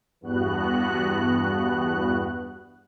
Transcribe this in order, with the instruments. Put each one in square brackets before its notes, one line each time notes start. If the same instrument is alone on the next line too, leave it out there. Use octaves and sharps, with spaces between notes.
[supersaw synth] E2 G2 B3 F#4 F#6